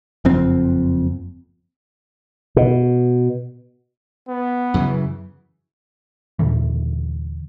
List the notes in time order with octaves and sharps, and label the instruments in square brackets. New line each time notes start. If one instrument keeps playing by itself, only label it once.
[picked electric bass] F#1 F2 C4
[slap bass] B2
[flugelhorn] B3
[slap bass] F#2 C#3 E3
[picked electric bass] D#2 A#2 D3 E3